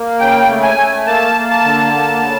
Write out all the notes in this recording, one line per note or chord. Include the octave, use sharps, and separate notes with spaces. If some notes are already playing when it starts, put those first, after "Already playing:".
Already playing: A#3
C#3 G5
A3
G#5
A3
A#3 A5
A#3
A5
D3
A#3
C#3